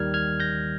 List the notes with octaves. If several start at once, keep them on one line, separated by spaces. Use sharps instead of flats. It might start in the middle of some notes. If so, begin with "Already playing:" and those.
Already playing: D#2 D#3 G3 F6 G#6
F6 G#6
G6 A#6